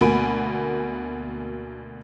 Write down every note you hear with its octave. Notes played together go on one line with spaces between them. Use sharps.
D2 B2 A#3 G#5 B5 D7